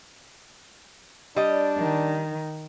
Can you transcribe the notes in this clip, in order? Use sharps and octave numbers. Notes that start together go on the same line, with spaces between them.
G3 D4 D#5
D#3